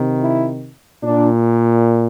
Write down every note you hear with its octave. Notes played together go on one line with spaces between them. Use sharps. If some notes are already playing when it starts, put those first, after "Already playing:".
Already playing: C3 D#3
E4
A#2 D4